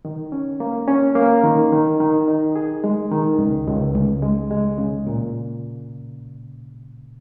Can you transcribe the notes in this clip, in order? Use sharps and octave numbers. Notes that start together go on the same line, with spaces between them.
D#3
C#4
A#3
C#4
A#3
D#3
D#3
D#3
D#4
G#4
G#3
D#3
C#2
C#2
C#2
G#3
G#3
C#3
A#2